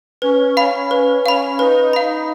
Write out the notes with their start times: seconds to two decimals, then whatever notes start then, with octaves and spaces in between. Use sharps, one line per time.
0.22 C#4 B4
0.57 F5 B5
0.91 B4
1.26 F5 B5
1.59 D#4 B4
1.93 F5 B5